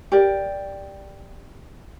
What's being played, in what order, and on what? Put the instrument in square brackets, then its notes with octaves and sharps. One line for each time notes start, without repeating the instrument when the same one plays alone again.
[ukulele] G4 A#4 D5